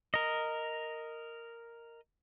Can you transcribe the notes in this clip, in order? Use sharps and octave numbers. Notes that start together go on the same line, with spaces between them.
A#4 D#5